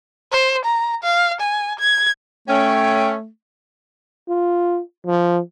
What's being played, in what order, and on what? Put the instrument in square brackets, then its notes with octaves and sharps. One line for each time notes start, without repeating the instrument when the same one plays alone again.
[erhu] C5
A#5
F5
G#5
G#6
[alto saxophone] A3 [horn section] C#4 [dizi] G5
[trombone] F4
F3